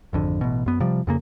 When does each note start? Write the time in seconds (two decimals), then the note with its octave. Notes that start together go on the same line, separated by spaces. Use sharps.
0.13 G#1 F2 D3
0.41 A1 B2
0.66 F#2 B3
0.80 C3 F3 G3
1.07 F2 C#3 A#3